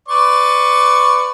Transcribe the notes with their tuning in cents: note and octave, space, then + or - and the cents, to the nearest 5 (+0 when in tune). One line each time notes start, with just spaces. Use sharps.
B4 +25 D5 +0 C#6 +0